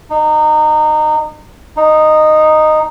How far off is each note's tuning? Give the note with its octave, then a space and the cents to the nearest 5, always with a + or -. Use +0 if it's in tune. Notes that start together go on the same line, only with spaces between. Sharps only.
D#4 -25
D#4 -10